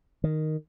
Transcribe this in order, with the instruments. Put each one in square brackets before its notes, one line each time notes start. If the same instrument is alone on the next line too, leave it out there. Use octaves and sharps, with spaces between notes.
[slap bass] D#3